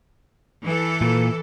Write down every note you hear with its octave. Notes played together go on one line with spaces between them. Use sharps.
E3 A4
A#2